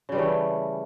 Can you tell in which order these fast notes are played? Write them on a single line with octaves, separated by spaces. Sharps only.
C#3 G3 E3 A3